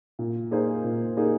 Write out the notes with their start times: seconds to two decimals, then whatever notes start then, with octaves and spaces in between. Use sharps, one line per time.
0.19 A#2
0.51 A#3 D#4 G#4 C5
0.84 A#2
1.17 A#3 D#4 G#4 C5